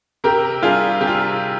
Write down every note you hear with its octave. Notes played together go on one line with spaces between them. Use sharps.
C3 G4 A#4
G3 D4 F4 G#4
C3 G4
F4